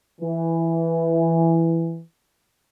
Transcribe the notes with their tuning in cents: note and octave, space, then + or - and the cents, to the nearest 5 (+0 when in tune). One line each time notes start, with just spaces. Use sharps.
E3 +5